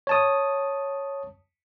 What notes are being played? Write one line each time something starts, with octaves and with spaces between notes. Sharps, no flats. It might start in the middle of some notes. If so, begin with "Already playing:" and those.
C#5 A5 D#6